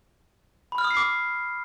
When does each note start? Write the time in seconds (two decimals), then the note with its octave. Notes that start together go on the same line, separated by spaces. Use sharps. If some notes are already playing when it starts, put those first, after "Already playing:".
0.72 B5
0.78 F6
0.84 D#6
0.91 C7
0.97 D6